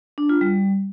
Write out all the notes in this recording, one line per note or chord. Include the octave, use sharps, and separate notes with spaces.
D4
F4
G3